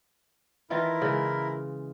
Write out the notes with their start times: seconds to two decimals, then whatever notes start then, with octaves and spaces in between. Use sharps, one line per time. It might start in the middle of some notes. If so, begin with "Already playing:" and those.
0.70 D#3 E3 E4 F4 A#4
1.01 C#3 G#3